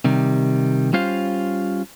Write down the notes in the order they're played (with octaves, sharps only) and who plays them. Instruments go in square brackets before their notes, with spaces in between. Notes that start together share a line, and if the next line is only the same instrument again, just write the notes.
[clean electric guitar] C3 D#3 G3
G3 C#4 F4 C5 F5